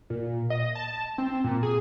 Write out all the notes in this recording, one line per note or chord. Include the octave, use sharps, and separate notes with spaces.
A#2
D#5
A5
C4
A#2
G#4